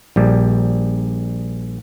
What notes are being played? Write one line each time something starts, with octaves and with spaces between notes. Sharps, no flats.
A#1 G3